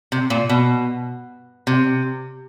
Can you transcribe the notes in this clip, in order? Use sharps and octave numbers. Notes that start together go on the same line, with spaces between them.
C3
A#2
B2
C3